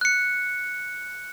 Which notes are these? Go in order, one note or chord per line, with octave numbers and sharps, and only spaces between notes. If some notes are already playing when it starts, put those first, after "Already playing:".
F#6 C#7